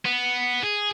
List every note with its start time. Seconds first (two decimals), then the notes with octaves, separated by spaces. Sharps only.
0.06 B3
0.62 G#4